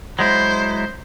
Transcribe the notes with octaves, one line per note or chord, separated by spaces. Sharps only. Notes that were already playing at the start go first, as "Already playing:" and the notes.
F#3 G#3 E4 C5